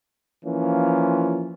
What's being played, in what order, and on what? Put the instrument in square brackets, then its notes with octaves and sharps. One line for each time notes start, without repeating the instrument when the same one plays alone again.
[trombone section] E3 F3 A#3 C#4 F4